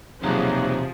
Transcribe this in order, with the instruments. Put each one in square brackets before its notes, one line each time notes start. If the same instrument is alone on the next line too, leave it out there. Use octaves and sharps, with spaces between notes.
[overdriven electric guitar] B1 E2 [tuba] C3 [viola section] F3 G#4 [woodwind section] F#3 A#3 D#4